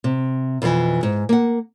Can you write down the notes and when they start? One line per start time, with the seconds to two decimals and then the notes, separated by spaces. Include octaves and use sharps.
0.04 C3
0.62 F2 B2 D3 E3
1.03 G#2
1.29 A#3 F#5